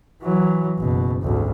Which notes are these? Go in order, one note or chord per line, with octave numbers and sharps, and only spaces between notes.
E3 F#3
F#1 B2
G#1 D2